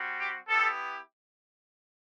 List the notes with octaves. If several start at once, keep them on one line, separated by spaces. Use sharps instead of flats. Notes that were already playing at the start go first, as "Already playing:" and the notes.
Already playing: G3 C4 F#4
G4
B3 E4 G4 A4